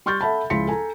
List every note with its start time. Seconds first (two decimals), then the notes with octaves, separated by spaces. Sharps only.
0.06 G3 C6 C#6 F6 G6 A6
0.21 A4 E5 F#5 A5 B5
0.50 C#2 F3 E4 C6 B6 C#7
0.67 A4 G#5 A#5